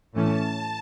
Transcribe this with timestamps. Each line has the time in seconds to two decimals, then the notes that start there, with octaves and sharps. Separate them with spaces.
0.13 A2 E3 A3 C#4 A5